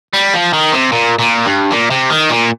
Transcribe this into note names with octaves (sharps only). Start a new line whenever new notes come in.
G3
F3
D#3
C3
A#2
A#2
G2
A#2
C3
D#3
A#2